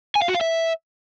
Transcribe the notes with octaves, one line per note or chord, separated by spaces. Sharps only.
G#5
F5
F#4
F5
E5